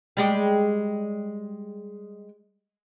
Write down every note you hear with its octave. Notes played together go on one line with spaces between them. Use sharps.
G3 G#3 G4